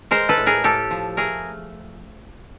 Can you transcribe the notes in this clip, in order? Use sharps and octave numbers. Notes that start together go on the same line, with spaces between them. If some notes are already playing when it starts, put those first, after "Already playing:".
G#3 A#4 C5
A4 B4
A2
G#4 A#4
A2 G4 A4
F3
A3 G#4 A#4